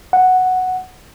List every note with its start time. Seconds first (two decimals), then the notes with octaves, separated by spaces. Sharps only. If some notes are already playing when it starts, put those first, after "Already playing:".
0.13 F#5